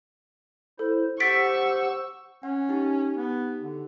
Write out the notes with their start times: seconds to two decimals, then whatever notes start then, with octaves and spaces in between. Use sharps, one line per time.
0.79 E4 A4 C5
1.20 G4 C5 F#5 C#6 E6 A6 B6 D7
2.43 C#4 F#5
2.69 D#4 G4
3.17 B3
3.60 D3